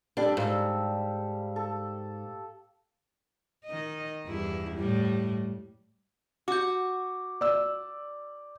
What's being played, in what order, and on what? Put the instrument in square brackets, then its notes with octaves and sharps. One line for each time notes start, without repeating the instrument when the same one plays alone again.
[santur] G3 G4 A4 [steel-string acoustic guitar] D4
[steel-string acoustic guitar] G#2 [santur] F5 E6
[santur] A4
[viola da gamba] D#3 D#5
E2 G2 E4
A2 G3
[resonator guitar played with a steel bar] F#4 [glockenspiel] D6 G6
[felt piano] D5 E6